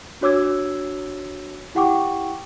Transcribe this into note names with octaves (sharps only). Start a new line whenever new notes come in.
D4 F#4 C#5 D6 E6 G#6
E4 G4 F#5 G5 C#6 D6